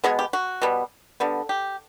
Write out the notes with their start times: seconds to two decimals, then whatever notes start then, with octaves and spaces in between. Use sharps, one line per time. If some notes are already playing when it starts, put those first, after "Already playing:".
0.04 B2 G#3 B3 G#4
0.19 G4
0.33 F#4
0.62 B2 G3 B3
1.20 D3 G3 B3
1.49 G4